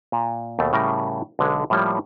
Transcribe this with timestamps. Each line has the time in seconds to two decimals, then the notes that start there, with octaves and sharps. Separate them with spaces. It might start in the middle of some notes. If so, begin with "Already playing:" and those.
0.12 A#2
0.59 D#2 B2 A3
0.73 A2 C#3 G3 A#4
1.39 B1 D3 G#3
1.70 A2 F3 G3 A#3 C#5